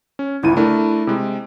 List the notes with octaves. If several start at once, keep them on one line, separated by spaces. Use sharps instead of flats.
C#4
G1 C#2 E4 D#7
A3 D4 E4 A#4
C3 G#3